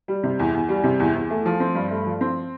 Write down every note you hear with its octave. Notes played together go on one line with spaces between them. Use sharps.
G3
C3
E2
E2
G3
C3
E2
E2
A3
F3
C4
G2
A3
F3
C4